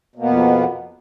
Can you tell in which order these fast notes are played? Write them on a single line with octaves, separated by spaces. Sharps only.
B2 A#3 B3 F2